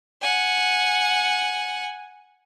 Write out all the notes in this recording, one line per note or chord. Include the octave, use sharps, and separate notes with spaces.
F#5 G#5